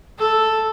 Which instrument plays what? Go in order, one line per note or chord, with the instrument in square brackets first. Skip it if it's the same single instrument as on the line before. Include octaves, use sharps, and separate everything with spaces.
[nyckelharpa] A4